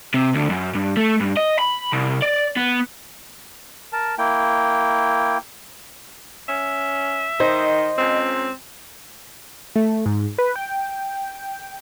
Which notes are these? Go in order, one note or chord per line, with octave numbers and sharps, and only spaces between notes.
C3
D2
F#2
G2
A3
G2
D#5
B5
C2
D5
B3
A#4 A5
A#3 E4 G5
C#4 E5
D#3 C5 D#5
C#2 C4
A3
G#2
B4
G5